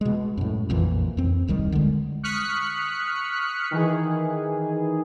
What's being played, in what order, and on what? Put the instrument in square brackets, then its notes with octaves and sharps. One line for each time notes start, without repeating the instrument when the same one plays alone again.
[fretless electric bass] B2 G#3
F#2 A2
A#1 F2 A#2 E3
F2 C4
D#1 C2 D#3 G3
D3 G#3
[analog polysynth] C#6 D#6 F6 F#6 B6 C#7
D#3 E3 G#4